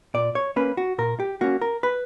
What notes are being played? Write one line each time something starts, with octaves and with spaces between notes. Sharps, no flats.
A#2 D5
C#5
A#3 C#4 B4
F#4
A#2 A#4
G4
A#3 C#4 F#4
A#4
B4